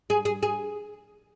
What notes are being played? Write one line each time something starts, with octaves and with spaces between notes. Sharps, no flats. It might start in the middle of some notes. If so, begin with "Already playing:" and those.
G#4
G#4
G#4